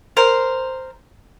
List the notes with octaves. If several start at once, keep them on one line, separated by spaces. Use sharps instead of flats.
A#4 C5